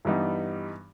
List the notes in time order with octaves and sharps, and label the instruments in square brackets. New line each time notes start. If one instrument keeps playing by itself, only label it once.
[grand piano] G2 E3 G3 B3 D#4